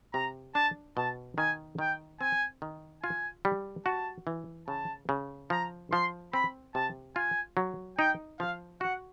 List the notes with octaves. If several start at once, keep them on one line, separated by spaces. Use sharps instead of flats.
C3 A#5
D4 A5
B2 A5
D#3 G#5
D#3 G5
C4 G#5
D#3
F4 G#5
G3
F#4 A5
E3
C#3 A5
C#3
F3 A#5
F3 C6
C4 B5
C3 A5
F4 G#5
F#3
D#4 G5
F3 F5
F#4 F#5